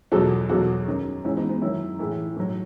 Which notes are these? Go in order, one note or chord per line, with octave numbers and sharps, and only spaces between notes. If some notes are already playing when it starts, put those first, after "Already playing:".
E2 B2 F#3 F#4 A4
E2 B2 F#3 F#4 A4
F#2 D#3 F#3
G#2 E3 C#4 E4
B3 D#4
B3
F#2 D#3 F#3 C#4 E4
A2 E3 E4 G#4
A2 F#3